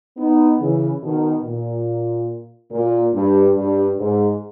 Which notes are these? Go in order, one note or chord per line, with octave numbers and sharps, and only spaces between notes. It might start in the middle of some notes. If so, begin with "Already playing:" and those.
B3 D#4
C#3 E3
B2 D#3
A#2
A#2
G2
G2
G#2